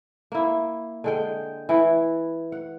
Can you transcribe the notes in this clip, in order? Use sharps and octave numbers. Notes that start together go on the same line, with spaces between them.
A#3 E4
D3 G#3 G5
E3 E4
F#5